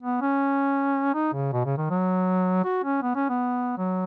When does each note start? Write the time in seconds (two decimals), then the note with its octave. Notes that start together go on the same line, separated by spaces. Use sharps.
0.03 B3
0.21 C#4
1.14 D#4
1.33 C#3
1.53 B2
1.65 C#3
1.78 D#3
1.90 F#3
2.64 F#4
2.84 C#4
3.02 B3
3.15 C#4
3.30 B3
3.78 F#3